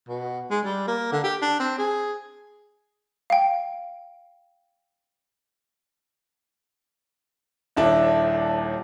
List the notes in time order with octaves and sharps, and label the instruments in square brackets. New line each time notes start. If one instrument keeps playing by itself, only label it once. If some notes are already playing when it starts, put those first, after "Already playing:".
[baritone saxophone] B2
G#3
G3
A#3
D3
G4
D4
C4
G#4
[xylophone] F5 G5
[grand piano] D#1 D#2 D4 E4 A4 A5